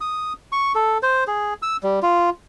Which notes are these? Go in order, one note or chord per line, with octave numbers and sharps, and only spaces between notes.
D#6
C#6
A4
C5
G#4
E6
G3
F4